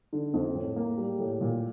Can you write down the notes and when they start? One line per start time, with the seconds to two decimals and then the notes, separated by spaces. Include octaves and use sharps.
0.13 D3
0.34 F2
0.55 A2
0.76 A#3
0.97 G3
1.19 A2
1.41 A#2